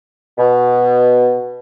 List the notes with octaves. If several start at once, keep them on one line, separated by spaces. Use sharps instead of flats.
B2